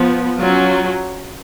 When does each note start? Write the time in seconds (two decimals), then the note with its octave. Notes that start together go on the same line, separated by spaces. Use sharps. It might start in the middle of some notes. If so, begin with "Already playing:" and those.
Already playing: F3 B3
0.39 F#3 C#4 F4